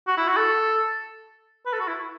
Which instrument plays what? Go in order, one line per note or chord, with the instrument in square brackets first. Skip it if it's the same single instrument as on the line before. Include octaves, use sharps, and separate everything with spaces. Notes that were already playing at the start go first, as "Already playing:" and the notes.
[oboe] F#4
E4
F#4
A4
B4
A4
F#4
E4